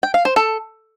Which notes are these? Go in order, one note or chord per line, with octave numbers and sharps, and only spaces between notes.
G5
F5
C5
A4